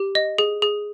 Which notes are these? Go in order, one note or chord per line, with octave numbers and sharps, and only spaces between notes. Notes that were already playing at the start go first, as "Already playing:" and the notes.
Already playing: G4
D#5
G#4
G#4